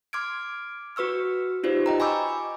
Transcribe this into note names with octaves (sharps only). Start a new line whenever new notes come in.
C6 D6 F6 G#6 D7
F#4 B4 C#6 E6 F6
D#4 F4 G4 C5 D5
D#5 G5 A#5
G#5 B5 C#6 D6 E6 G6